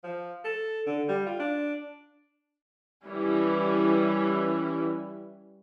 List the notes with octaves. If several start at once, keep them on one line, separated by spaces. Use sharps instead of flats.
F3
A4
D3
G3
F4
D4
E3 G3 C#4 E4